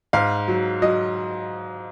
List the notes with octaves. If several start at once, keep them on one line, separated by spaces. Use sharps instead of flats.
G#2 F5
F#3
F#3 D#5